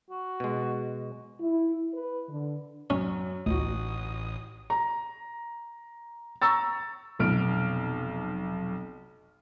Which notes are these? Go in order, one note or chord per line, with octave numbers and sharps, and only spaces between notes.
F#4
B2 G#3
E4
B4
D3
F#2 C#4
A1 D2 D#4 F#4 D#6
A#5
A#5 C#6 E6 A6
F1 B1 F6 D7